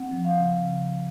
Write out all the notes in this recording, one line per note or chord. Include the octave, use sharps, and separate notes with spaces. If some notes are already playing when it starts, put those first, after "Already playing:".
Already playing: C4 F#5
F3
F5
C#3
C#3